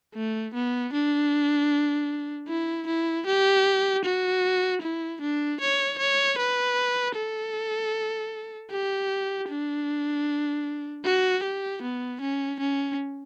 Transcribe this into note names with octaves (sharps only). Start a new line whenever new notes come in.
A3
B3
D4
E4
E4
G4
F#4
E4
D4
C#5
C#5
B4
A4
G4
D4
F#4
G4
B3
C#4
C#4